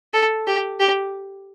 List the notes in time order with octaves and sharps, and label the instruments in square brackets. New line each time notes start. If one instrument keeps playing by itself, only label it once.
[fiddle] A4
G4
G4